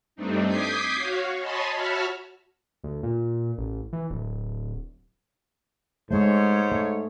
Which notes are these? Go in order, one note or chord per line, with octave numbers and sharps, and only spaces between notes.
G2 A3 C4 D4 D#4
D6 D#6 G6 G#6 B6 C7
F#4 C#5 F5
C#5 D#5 G#5 A5 B5 C6
F#4 C#5 E5 A5 B5 F6
D2
A#2
A1
E3
D1
G#2 G#3 A3 C5 C#5
A3